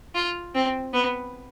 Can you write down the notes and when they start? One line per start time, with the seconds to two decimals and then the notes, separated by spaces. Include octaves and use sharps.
0.15 F4
0.55 C4
0.93 B3